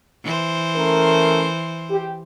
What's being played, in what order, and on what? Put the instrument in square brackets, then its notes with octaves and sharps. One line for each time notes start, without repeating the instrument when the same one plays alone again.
[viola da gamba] E3 C5
[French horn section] A3 C#4 A#4
G4